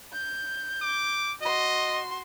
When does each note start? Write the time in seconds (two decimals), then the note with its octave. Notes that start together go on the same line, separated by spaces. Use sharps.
0.13 G6
0.82 D6
1.42 F#4 D#5 C6